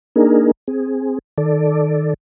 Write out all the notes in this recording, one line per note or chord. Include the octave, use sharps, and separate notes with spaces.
A#3 D4 D#4 G#4 A#4
C4 G#4
D#3 A4 D5